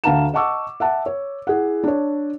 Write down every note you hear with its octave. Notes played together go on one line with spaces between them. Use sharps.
D2 F5 F#5 A5 A#5 E7
D#5 F#5 A5 C#6 D6 E6
E5 F#5 A5
C#5
E4 G#4 F#5
D4 C#5